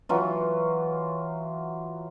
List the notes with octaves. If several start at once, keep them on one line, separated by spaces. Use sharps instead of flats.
E3 F#3 F4